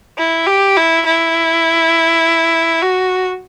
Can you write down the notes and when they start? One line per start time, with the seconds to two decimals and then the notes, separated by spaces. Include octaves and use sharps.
0.18 E4
0.47 G4
0.77 E4
1.06 E4
2.82 F#4